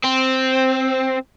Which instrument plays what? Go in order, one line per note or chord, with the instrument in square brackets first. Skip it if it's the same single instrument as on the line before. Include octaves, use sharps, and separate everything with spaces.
[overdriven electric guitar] C4